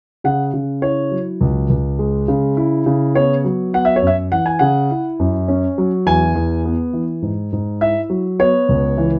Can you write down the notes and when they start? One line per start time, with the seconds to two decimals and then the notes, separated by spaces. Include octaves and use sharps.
0.24 C#3 F#5
0.54 C#3
0.82 E4 C#5
1.11 F#3
1.41 C#2
1.70 C#2
1.99 G#3
2.28 C#3
2.57 E4
2.86 C#3
3.15 B3 C#5
3.45 F#3
3.73 B3 F#5
3.85 E5
3.96 C#5
4.02 F#2 E5
4.32 E3 F#5
4.46 G#5
4.59 C#3 F#5
4.91 E4
5.19 F#2
5.48 C#4
5.78 F#3
6.06 E2 G#5
6.35 E2
6.65 B3
6.93 E3
7.22 G#2
7.53 G#2
7.81 E4 E5
8.10 F#3
8.39 B3 C#5
8.69 C#2
8.98 E3